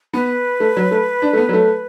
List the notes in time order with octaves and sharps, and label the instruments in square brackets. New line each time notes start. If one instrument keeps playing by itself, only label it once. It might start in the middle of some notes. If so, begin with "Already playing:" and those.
[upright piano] B3 [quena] B4
[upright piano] A3
F#3
A3
D4
A3
B3
F#3
A3